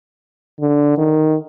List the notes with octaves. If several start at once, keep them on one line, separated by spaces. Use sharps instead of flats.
D3
D#3